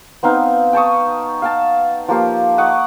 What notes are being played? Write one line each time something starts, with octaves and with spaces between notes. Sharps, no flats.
B3 C4 D#4 F5
G5 A5 C#6 D#6
F5 G5 A5
F3 A#3 G4 F5
D#5 F#5 C#6 D6